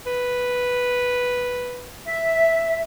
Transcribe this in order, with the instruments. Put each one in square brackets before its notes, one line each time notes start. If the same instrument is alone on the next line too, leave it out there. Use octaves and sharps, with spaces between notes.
[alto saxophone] B4
[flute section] E5